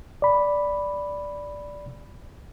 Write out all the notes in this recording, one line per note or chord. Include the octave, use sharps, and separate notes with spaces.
D5 B5